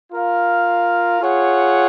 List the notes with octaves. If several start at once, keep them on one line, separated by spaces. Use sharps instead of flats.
F4 A#4 F5
F4 G#4 C#5 F#5